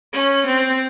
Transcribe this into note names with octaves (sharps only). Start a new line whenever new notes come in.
C#4
C4